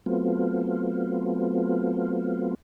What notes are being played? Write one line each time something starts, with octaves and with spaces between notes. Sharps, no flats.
F#3 A3 B3 C4 F4